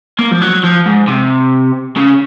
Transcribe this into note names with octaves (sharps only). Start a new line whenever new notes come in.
A#3
F3
F#3
F3
G#2
C3
C#3